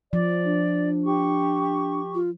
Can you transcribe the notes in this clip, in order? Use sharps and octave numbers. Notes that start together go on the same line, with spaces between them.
F3 D5
D4
G4 C#6
F4